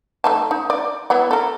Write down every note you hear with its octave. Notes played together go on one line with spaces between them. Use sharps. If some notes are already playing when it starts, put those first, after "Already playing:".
A3 D#4 A5
D#4
D5
B3 E4 F#5
A4 A#4